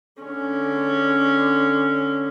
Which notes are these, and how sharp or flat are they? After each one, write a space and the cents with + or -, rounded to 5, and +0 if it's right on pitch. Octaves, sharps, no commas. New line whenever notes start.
D3 +0 C#4 +0